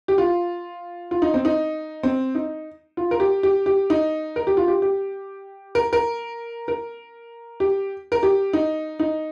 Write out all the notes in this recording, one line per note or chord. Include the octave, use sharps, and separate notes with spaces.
G4
F4
F4
D#4
C4
D#4
C4
D#4
F4
A#4
G4
G4
G4
D#4
A#4
G4
F4
G4
G4
A#4
A#4
A#4
G4
A#4
G4
D#4
D#4